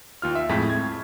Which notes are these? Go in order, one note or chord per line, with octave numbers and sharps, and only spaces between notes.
D#2 F4 F6
E5
F2 A2 G#3 C#6 B6
G#6